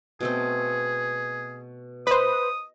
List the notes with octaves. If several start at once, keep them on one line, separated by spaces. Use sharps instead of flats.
B2 A3 C4 G#4
B4 C5 D#5 D#6